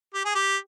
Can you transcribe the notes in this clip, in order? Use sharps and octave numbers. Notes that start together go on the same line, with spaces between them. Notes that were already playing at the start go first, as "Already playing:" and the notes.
G4
G#4
G4